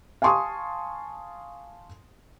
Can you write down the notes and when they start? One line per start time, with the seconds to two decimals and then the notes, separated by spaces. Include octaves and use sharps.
0.22 F5 G#5 A5 C6 C#6 D#6